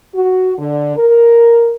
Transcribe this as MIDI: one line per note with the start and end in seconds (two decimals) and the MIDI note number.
0.13 0.52 66
0.58 0.95 50
0.97 1.75 70